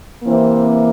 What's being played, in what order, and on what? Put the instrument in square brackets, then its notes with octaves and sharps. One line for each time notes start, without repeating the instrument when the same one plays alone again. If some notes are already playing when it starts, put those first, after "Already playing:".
[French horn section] C3 E3 A#3 C4